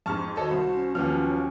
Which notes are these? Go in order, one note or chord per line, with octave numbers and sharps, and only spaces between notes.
F2 G#2 A5 C#6 F6
D#3 F#4 A4 C5 C#5 D#5 A5
C2 B5
C#4
D#2 F3 F#3 B3 C#4 F4 F6